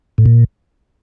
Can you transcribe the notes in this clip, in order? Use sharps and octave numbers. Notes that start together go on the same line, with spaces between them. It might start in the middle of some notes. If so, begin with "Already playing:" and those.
A2
A#2